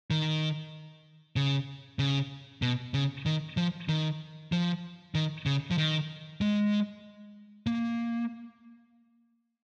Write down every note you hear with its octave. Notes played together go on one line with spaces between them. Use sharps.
D#3
C#3
C#3
B2
C#3
D#3
F3
D#3
F3
D#3
C#3
F3
D#3
G#3
A#3